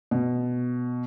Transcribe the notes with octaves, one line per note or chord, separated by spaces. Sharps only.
B2